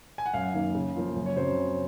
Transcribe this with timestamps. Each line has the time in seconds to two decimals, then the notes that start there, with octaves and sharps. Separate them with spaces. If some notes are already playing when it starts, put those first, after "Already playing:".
0.18 G#5
0.26 F#5
0.34 F#2 F5
0.54 D#3 A#3
0.75 C#3
0.95 F3 A#3 F4
1.16 F#2
1.26 C#5
1.36 C#3 F#3 C4 C5